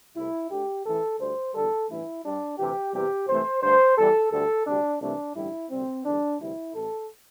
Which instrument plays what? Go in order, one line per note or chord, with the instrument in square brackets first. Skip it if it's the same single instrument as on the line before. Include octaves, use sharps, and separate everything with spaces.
[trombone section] C2 C3 A3 E4
D2 D3 A3 G4
A1 A2 E3 A4
D2 D3 G3 C5
E2 D3 G3 A4
A1 G2 E3 A3 E4
G2 G3 D4
D2 C3 E3 G4
E2 C3 E3 G3 G4
C2 C3 E3 A3 C5
G2 D3 A3 C5
E2 E3 G3 A4
D2 D3 G3 A4
D2 C3 G3 D4
C2 C3 E3 A3 D4
A1 G2 D3 G3 E4
D2 C3 G3 C4
E2 D3 G3 D4
D2 C3 E3 G3 E4
A1 A2 A3 A4